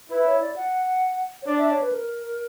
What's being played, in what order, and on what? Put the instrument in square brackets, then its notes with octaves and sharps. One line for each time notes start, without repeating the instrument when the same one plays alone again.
[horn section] E4 [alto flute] B4
[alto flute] C#5
D5
F#5
C#5
[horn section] D4 [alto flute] D5
[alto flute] E5
C#5
B4
A#4